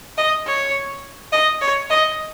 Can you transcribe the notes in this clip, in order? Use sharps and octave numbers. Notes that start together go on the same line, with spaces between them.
D#5
C#5
D#5
C#5
D#5